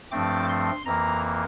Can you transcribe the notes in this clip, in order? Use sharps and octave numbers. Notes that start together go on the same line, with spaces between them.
G2 F3 A3 C4 D6
C6
F2 E3 A#3 A#5